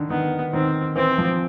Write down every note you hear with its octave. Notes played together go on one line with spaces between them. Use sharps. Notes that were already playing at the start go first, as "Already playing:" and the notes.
Already playing: D3 D#3
D#3 B3
D#3 C4
E3 C4
F3